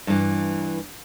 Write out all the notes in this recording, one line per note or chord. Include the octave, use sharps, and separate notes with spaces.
G2 E3